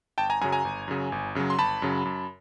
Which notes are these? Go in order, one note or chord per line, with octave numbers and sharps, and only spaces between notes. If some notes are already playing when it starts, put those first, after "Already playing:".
G1 G5 A5
G#5 A#5
F#2 C#3 F#3 G#5 A#5
G#5 A#5
G1
F#2 C#3 F#3
G1
F#2 C#3 F#3
C6
G1 A5 B5
F#2 C#3 F#3
F#2